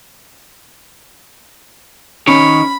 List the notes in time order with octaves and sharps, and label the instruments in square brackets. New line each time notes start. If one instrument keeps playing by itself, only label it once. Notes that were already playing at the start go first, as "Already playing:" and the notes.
[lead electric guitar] D#3 C#5 [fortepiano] C#4 [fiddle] B5